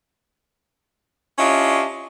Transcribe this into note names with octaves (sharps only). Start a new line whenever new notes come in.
C#4 D4 E4 F4 G4 D#5